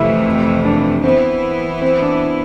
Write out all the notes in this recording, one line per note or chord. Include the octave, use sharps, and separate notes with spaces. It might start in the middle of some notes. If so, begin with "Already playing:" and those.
Already playing: F2 C3 E3 A3 E4
D4
E3 B3 C4 E4
C4
D4